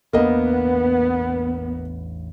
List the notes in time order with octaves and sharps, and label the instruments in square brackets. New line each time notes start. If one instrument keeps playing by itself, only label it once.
[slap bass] A1 E2 D4 [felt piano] A#3 D#5 [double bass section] B3